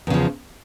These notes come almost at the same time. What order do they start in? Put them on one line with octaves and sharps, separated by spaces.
E2 C#3 F3